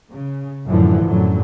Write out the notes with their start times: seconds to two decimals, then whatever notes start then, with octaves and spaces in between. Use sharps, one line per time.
0.11 C#3
0.68 F#2 A2 D3 E3 F3
1.05 F#2 A2 D3 F#3